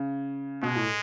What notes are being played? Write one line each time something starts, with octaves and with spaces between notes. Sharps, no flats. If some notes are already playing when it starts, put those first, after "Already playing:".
Already playing: C#3
B2 G#3
A2